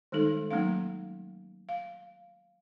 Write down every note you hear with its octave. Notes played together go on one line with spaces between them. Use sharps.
D#3 G3 G#3 D#4 A4
F#3 A3 A#3 C#4 D#4 F5
F5